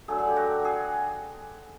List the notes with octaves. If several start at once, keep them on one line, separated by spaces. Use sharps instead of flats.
D3 F#3 A3 G#4
G#4
G4
F#4
G#4